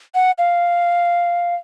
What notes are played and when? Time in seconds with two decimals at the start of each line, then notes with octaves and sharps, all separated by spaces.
0.15 F#5
0.38 F5